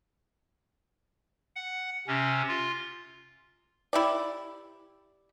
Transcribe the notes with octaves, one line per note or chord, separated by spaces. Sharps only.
F#5
C3 C#4
F4
E4 G4 D5